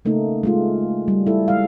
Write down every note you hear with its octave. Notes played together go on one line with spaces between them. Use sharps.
C#3 A3 A#3 D#4
G#3 A3 F4
G3
E4 A4
G#3 F5